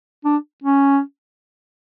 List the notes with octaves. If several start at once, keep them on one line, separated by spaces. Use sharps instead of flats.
D4
C#4